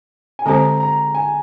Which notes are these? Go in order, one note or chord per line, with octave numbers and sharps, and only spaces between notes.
G#5
D3 G#3 C4 G4 C5 A#5
A#5
G#5